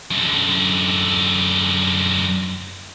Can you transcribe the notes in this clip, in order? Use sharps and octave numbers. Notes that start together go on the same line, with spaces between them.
F#2 D3